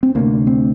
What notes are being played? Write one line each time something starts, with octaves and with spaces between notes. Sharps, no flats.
C4
D2 C3 A#3
C4